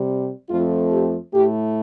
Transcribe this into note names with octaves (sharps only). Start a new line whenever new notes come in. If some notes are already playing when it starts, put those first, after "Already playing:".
Already playing: C3 G3
F2 F3 A3 F4
G4
A2 A3 G4